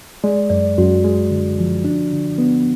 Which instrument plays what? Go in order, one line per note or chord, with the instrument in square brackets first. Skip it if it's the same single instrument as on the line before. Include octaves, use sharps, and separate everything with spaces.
[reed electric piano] G#3 [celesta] D5
[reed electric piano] F#2 [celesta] D5
[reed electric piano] F#2 [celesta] F#4
[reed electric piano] G#3
D3
F3
D4
D3
B3